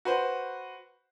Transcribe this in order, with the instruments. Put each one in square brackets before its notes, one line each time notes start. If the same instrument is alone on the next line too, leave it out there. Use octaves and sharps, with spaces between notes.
[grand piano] F#4 B4 C5